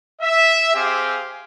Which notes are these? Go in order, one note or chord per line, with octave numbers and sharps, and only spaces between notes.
E5
C4 G4 G#4 F5